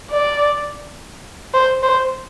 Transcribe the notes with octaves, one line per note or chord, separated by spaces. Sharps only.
D5
C5
C5